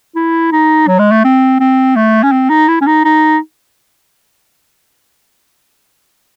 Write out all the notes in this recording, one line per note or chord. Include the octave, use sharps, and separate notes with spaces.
E4
D#4
F#3
G#3
A3
C4
C4
A3
C#4
C4
D#4
E4
C#4
D#4
D#4